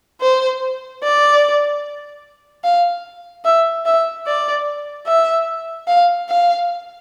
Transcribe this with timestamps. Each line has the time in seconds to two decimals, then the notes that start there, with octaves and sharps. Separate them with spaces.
0.21 C5
1.03 D5
2.64 F5
3.45 E5
3.86 E5
4.27 D5
5.07 E5
5.87 F5
6.29 F5